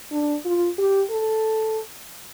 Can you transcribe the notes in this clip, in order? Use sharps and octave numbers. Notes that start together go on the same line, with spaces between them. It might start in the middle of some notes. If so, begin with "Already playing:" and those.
D4
F4
G4
A4